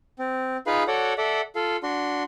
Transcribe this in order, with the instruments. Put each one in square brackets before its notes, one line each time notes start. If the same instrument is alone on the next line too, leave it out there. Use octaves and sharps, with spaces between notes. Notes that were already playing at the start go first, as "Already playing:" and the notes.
[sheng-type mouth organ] C4
D#4 F4 G#4 B4 F5 B5
F#4 A4 C#5 D5 F#5
A4 D5 E5 F#5
F4 A4 F5
D4 F#4 C6